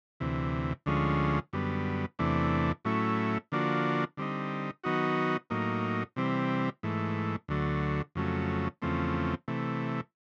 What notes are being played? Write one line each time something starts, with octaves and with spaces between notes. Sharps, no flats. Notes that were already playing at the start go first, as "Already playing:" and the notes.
D2 C3 E3
D2 D3 F3 G#3 C#4
F#2 D3 G3 B3
E2 C3 E3 A3 D4
A2 F#3 A3 C#4 E4
D3 F3 A#3 D4 F#4
D3 G3 C4 D#4
D#3 F#3 B3 D#4 F#4
A2 F#3 A#3 D#4
C3 E3 G3 C4
G#2 E3 A3
D2 D3 F#3 A3
F2 C#3 F#3 A3
E2 C#3 F3 A3 C4
C3 E3 A3